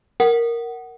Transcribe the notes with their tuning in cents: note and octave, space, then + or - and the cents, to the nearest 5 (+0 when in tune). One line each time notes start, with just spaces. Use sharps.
A#4 +0 F#5 +15